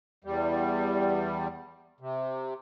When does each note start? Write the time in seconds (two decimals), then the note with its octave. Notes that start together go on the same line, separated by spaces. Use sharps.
0.24 E2 G3
2.00 C3